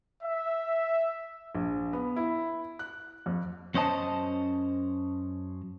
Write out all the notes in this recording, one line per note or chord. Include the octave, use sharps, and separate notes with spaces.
E5
A#1
B3
E4
F#6
F2
F#2 C#4 C5 D#5 A5